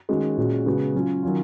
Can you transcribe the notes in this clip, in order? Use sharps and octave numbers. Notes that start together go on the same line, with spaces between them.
D#3 G#3 C#4 F#4
A#2 G#3 C#4 F#4
C#3 G#3 B3 F#4
F#3 C#4 F4
D#3 F#3 C#4 F4